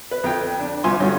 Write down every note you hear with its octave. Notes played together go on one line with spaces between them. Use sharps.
B4
F2 G5
D4
C2 F4 G#5 C6
G2 D3 F#3 C#4